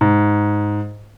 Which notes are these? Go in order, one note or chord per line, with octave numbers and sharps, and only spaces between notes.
G#2